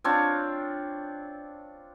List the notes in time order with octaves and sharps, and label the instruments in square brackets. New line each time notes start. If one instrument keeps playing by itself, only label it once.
[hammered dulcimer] C4 D4 F4 C#5